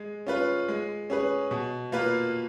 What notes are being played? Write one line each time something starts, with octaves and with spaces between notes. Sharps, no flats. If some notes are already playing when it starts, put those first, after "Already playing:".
Already playing: G#3
C#4 F4 B4
G#3
C#4 G#4 B4
B2
A#3 F4 B4